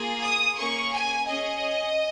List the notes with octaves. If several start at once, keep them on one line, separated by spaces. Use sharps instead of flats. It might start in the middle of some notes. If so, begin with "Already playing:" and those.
Already playing: A#3 F4 G#4
D#6
A#3 C#4 G#4 C#6
G#5
C#4 G#4 D#5